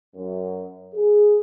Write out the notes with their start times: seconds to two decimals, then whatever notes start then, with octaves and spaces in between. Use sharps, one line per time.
0.16 F#2
0.95 G#4